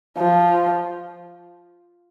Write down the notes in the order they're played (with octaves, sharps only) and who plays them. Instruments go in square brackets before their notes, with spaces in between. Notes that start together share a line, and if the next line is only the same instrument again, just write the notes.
[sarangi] F3